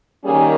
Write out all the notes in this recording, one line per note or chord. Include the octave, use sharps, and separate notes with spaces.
D#3 G3 A#3 C#4 G#4